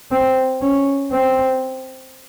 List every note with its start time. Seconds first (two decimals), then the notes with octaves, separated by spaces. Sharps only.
0.11 C4
0.62 C#4
1.11 C4